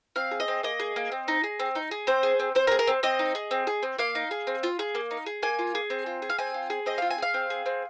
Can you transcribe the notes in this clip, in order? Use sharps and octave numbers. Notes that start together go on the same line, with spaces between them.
C4 F5
G#4
D#5
C4
A#3 D#5
G#4
A#3
C4
D#4
G#4
C4
D#4
G#4
C4 C5
G#4
C4
C4 C5
A#4
G#4
A#4
C4
C4 D#5
D#4
G#4
C4
G#4
C4
A#3 F5
D#4
G#4
C4
F4
G#4
A#3
D#4
G#4
A#3 G#5
F4
G#4
C4
F4
G#4
F5
C4 G#5
F4
G#4
C4 D#5
F4 F5
G#5
G#4 F5
C4
G#4
C4